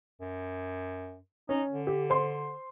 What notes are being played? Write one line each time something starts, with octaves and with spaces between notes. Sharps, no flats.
F#2
C#4 D#4
D3
G4
C5 C6